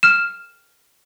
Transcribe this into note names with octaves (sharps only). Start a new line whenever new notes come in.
F6 E7